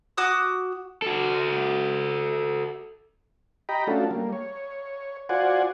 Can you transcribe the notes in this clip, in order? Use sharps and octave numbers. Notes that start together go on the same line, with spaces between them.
F#4 D6 D#6
F#4 A4
G4 D#5 G5 A#5 B5
A3 C#4 D4 F4 F#4 A4
G3 A#3
C#5
F4 F#4 C5 D5 F#5 G#5